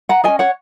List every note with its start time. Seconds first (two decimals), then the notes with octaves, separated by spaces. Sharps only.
0.09 F#5 A#5
0.24 C#4 G#4 D#5 G#5
0.39 C#5 F#5